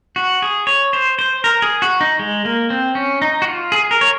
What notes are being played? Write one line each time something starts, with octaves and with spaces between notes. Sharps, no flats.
F#4
G#4
C#5
C5
C5
A#4
G#4
F#4
D#4
G#3
A#3
C4
C#4
D#4
F#4
F4
G#4
A#4
C#5